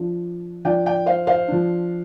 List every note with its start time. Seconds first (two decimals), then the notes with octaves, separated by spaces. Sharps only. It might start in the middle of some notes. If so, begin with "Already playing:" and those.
Already playing: F3 D4
0.65 F3 D4 D5 G5
0.86 D5 G5
1.06 C5 F5
1.27 C5 F5
1.48 F3 D4